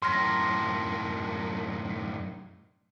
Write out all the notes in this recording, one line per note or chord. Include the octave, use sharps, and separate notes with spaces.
F#2 A2 C6 F6 A#6